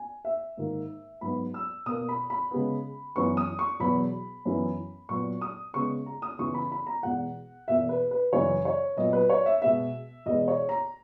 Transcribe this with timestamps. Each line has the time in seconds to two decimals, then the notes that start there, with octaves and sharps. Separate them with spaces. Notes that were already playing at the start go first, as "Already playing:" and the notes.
Already playing: G#5
0.25 E5
0.57 G#2 D#3 A#3
1.21 G#2 F#3 B3 B5
1.54 E6
1.86 B2 A#3 D#6
2.09 B5
2.30 B5
2.51 C#3 G#3 B3
3.16 F#2 E3 B3 C#6
3.37 D#6
3.59 C#6
3.80 E2 B2 F#3 B3 B5
4.46 F#2 E3 B3
5.09 A#2 F#3 B3 C#6
5.41 D#6
5.74 C#3 G#3 B3 C#6
6.06 A#5
6.22 D#6
6.38 E2 C#3 E3 B3 C#6
6.54 B5
6.72 B5
6.87 A#5
7.03 E2 B2 G#3 B3 F#5
7.68 E2 B2 A#3 E5
7.89 B4
8.11 B4
8.33 F#2 C#3 E3 C#5
8.65 C#5
8.97 A#2 F#3 B3 D#5
9.13 B4
9.30 C#5
9.46 E5
9.61 B2 G#3 B3 E5
10.26 E2 B2 G#3 B3 D#5
10.48 C#5
10.69 A#5